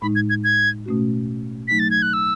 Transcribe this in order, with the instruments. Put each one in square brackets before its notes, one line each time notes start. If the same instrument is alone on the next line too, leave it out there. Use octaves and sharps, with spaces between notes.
[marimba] A2 G#3 D#4 [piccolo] B5
[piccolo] G#6
G#6
G#6
[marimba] B2 A3 C#4 F#4
[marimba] F#3 A3 D#4 [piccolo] B6
[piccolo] A6
G#6
F#6
E6